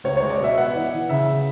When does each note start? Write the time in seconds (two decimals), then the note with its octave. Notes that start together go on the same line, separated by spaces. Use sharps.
0.04 C#2 C#5
0.17 C#5
0.22 G#3
0.30 D5
0.39 B2 E5
0.56 B3 F#5
0.75 E3
0.92 E3
1.09 C#3 E5
1.27 C#3